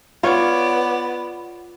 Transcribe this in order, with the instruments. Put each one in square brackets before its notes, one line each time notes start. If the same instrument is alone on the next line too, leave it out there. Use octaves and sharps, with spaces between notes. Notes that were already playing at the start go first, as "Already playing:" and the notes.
[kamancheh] B3 D5 [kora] F4 C#5